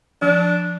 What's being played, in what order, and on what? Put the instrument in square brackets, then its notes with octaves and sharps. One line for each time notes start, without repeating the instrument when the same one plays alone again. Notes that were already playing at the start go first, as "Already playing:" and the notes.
[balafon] F3 [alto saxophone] D4